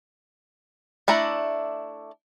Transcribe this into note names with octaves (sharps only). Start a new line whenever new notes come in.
A3 D4 E4 A#5